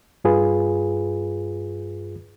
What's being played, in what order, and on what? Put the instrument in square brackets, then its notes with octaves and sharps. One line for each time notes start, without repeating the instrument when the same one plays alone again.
[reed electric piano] G2 F4 G#4 B4